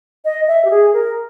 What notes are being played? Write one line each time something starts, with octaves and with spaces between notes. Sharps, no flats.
D#5
E5
G4
G#4
A#4